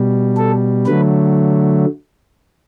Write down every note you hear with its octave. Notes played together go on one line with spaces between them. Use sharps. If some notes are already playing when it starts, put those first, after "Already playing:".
Already playing: B2 G3
A4
D3 F#3 A3 B4